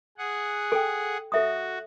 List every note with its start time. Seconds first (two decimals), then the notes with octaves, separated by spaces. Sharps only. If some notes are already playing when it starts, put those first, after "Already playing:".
0.18 G#4 F#5
0.72 A4 G5
1.32 F#4 A4 E5 D#6